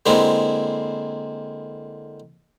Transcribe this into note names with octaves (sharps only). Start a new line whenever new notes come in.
D3 G#3 A#3 C4 E4